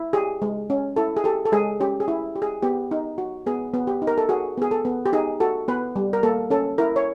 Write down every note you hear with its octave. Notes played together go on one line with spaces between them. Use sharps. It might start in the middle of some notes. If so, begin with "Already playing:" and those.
Already playing: E4
G4 G#4
G#3
C#4
E4 A4
G#4
G4 A4
A4
G#3 G#4
C#4 G4
G#4
E4
G4
G#4
B3 G4
D#4
F#4
B3 G#4
B3
G4
D#4
A#4
A4
F#4 G#4
B3 G#4
A4
B3
G4
D#4 G#4
F#4 A4
B3 B4
G3
A#4
A#3 A4
C#4 A4
E4 A#4
C#5